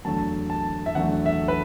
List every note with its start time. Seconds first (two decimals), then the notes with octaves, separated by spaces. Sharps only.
0.05 E2 D3 F#3 A3 A5
0.50 A5
0.86 E5
0.95 E2 D3 F#3 A3 F#5
1.26 E5
1.48 B4